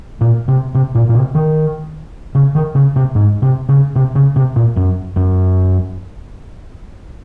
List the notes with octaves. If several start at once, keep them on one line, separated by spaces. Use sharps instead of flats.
A#2
C3
C3
A#2
A#2
C3
D#3
C#3
D#3
C#3
C3
G#2
C3
C#3
C3
C#3
C3
A#2
F#2
F#2